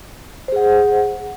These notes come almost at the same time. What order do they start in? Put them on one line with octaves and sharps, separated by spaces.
C5 G#4 F#5